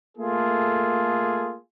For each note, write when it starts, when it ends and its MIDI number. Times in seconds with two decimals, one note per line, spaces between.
0.18 1.57 57
0.18 1.57 58
0.18 1.57 65
0.18 1.57 68
0.18 1.57 69